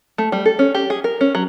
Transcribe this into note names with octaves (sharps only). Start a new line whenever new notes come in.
A3
G3
A4
C#4
G4
G#4
A#4
C#4
F#3